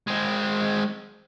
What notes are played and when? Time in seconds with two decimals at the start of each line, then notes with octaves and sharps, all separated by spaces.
0.08 G#3 C4